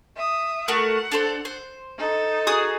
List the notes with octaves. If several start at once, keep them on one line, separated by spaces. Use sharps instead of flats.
E5 D#6
A3 F#4 A#4 F#5
D4 A4 C5
C5
D#4 A4
F#4 G#4 D#6